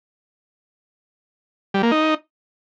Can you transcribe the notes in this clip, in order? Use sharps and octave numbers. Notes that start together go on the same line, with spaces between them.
G3
A#3
D#4